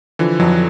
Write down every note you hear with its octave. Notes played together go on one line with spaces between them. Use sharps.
D3 E3 F3
F2 E3 F#3